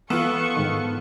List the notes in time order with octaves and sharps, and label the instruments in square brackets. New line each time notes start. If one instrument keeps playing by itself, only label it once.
[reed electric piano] E3 [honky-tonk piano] B3 F4 [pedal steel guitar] A4 [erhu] C#6
[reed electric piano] G#2 D#3